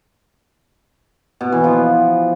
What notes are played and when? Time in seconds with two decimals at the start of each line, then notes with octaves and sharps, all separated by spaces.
1.41 B2
1.52 E3
1.64 F3